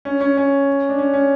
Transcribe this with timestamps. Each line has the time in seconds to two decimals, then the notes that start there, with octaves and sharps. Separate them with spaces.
0.05 C#4
0.21 C#4
0.37 C#4
0.89 D4
0.98 C#4
1.14 C#4